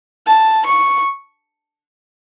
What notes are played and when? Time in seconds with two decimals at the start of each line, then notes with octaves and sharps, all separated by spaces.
0.26 A5
0.66 C#6